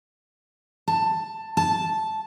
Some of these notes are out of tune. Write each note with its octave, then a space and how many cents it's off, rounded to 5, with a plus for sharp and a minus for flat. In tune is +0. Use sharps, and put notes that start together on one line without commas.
A5 +10
A5 -5